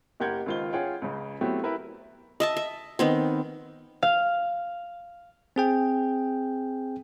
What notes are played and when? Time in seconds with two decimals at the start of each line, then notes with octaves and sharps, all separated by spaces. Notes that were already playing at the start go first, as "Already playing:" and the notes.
0.20 F#1 G4 A#4 F#5 G6 G#6
0.46 C#2 D#3 F4 C5 G7
0.73 C#4 F4 G#4 F#5 G5
1.02 C#2 C#3
1.41 F#3 A3 B3 C4 E4 G4
1.64 E4 G4 A#4 B4
2.40 D#5 E5 A5
2.57 E5
2.99 D#3 B3 C4
4.03 F5
5.56 C4 G#4 G5